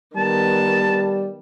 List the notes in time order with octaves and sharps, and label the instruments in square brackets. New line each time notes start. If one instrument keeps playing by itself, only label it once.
[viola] D#3 B3 [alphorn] G3 [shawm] A5